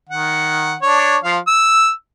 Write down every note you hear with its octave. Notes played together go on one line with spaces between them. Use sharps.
D#3 F#5
D4 C#5
F3 F5
E6